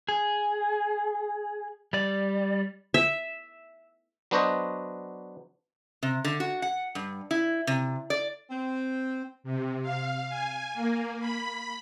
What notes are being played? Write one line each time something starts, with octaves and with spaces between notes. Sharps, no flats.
G#4
G3 D5
E5
F#3 B3 D4 F#4 C5 D#5
C3
D3
F#4
F#5
G2
E4
C3
D5
C4
C3
F5
G#5
A#3
B5